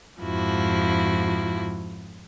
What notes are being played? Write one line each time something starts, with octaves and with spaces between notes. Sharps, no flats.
F2 G#2 F3 E4 F#4